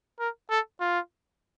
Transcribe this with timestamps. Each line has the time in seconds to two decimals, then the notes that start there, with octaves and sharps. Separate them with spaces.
0.20 A#4
0.50 A4
0.81 F4